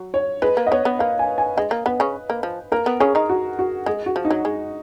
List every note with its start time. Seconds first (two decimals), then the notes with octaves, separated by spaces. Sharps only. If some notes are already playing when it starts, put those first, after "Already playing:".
Already playing: F#3
0.14 C#5
0.42 G#3 B4
0.57 A#3
0.67 D#5
0.71 B3 C#5
0.85 B3
0.99 A#3 F5
1.19 G#5
1.38 G#5
1.57 G#3 D#5
1.71 A#3
1.86 B3 B4
2.00 C#3 C#4
2.30 A#3
2.43 F3
2.72 A#3 A#4
2.86 B3
3.00 C#3 C#4 G#4
3.15 D#3 D#4
3.29 F#4
3.59 F#4
3.86 G#3 G#4
4.06 F#4
4.16 F3
4.25 D#4
4.30 F#3
4.45 G#3